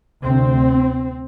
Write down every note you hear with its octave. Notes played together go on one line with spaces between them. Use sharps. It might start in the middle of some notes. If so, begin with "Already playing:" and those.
D2 C3 C4